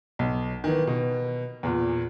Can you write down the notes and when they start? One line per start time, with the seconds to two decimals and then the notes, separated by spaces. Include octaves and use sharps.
0.19 B1
0.64 D#3 E3
0.87 B2
1.63 E2 A#2